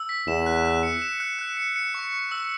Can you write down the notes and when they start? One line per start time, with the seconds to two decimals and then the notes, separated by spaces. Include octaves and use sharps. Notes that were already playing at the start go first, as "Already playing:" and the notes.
Already playing: E6
0.09 B6
0.27 E2 E7
0.46 F#6
0.65 F#6
0.83 C#7
1.02 E7
1.20 F#6
1.39 F#6
1.57 C#7
1.76 C#7
1.94 C#6
2.13 C#6
2.31 E6